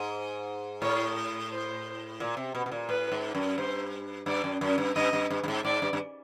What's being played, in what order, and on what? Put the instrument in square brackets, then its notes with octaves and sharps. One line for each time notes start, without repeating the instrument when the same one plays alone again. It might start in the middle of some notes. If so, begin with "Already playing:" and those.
Already playing: [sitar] G#2
[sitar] A2 [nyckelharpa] C#5
[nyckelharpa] C5
[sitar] A#2
C3
B2
B2
A#2
[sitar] A2 [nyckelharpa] B4
[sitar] G#2
F#2
[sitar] G2 [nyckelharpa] C5
[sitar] G2 [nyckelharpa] D5
[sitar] F#2
F#2
G2
[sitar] G2 [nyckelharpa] D#5
[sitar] G2
G2
G2
G#2
[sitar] G#2 [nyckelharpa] D5
[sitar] G2
G2